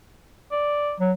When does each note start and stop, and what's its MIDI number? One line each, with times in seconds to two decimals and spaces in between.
0.52 0.94 74
1.00 1.12 54